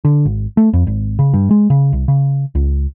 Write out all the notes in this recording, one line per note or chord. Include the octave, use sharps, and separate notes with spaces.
D3
G#1
A3
F2
G#1
C#3
G2
G#3
C#3
C2
C#3
C#2